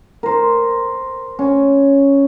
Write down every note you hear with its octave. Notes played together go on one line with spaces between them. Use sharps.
A#4 C5
C#4